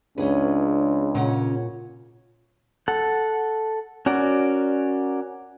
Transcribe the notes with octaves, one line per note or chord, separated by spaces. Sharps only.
C#2 C#4 D4 G#4 B4
A#2 C#3 C#4 F#5
A4 F#5
C#4 F#4 A#4 D5